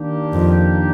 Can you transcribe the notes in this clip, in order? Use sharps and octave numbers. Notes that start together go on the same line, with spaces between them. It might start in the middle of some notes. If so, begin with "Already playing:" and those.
Already playing: D#3 A#3 D4 G4
F2